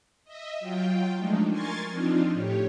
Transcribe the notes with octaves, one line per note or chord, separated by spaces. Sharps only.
D#5 E5
F#3 F4 G5
F3 G#3 A3 D4 D#4
A#4 G#5 C6 C#6 G#6 A6
F3 C4 D4 D#4 F4
A2 G4 C#5